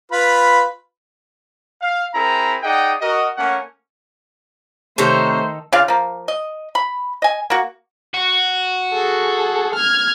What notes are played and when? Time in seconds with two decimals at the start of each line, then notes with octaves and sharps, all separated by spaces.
0.12 F4 B4 B5
1.81 F5
2.14 C4 E4 G#4 A#4 A#5
2.63 D#4 G#4 D5 D#5 F#5 G5
3.01 F#4 A#4 D#5
3.37 A3 A#3 C#4 A#4 F#5
4.98 C3 D#3 A3 A4 C5 C#5 A#5
5.73 C#3 D4 F4 F5
5.88 F3 A#3
6.28 D#5
6.75 B5
7.22 D#5 G#5
7.50 A#3 F#4
8.14 F#4
8.94 G#4 A4
9.75 F6 G#6